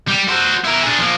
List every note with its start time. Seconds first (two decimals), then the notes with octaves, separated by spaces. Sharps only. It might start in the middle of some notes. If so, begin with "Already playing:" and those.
0.08 G3
0.28 F#4 C5
0.65 E4 A#4
0.83 D4 G#4
0.98 F3 A#3